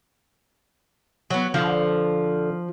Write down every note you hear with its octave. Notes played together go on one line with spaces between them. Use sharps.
F#3 B3
D3 F3